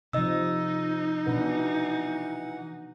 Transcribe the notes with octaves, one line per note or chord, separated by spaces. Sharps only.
C3 F3 D#4 D#5 E6
B2 E3 D4 B4 F#5